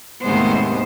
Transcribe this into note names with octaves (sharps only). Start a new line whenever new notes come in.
D#2 A2 C3 G#3 B3 C5